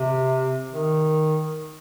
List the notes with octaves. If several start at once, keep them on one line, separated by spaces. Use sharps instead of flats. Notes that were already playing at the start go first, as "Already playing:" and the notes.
Already playing: C3
D#3